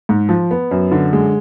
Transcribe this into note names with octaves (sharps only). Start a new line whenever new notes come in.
G#2
F3
B3
F#2
D3
G#3